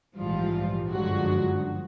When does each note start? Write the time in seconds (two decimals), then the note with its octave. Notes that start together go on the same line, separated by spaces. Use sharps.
0.16 A#1 G#2 E3 F3 G3 F4
0.90 G1 F#2 D3 F3 F#3 G#3 F#4